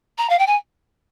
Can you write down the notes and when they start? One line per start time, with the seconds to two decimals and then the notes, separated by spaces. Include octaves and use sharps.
0.17 A#5
0.29 F5
0.38 G5
0.46 G#5